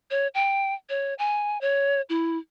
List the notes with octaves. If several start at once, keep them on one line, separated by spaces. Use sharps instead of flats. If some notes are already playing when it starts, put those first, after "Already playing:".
C#5
G5
C#5
G#5
C#5
E4